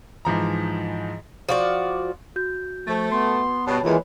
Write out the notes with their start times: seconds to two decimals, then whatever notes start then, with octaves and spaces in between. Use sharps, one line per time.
0.25 G#2 E3 F3 A#5
1.49 F3 F#4 D5
2.36 F#4 G6
2.87 F3 A3
3.12 B3 C6
3.67 G2 B2 C#5 A5 B5
3.84 D#2 E3 G#3 F4